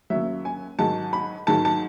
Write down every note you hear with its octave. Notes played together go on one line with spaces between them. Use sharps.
D#2 C#3 F#3 E5
G#5
G#2 D#3 F#3 A5
B5
G#2 D#3 F#3 A5
A5